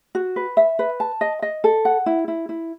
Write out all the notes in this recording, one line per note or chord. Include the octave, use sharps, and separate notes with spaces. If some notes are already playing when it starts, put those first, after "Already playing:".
F#4
B4
E5
B4
A5
D#5
D#5
A4
F#5
E4
E4
E4